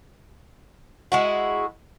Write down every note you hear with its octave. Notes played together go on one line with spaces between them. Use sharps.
G#3 E4 F#4